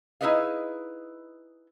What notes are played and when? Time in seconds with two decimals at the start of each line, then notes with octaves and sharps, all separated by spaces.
0.21 D#4 E4 G#4 B4 D#5 F5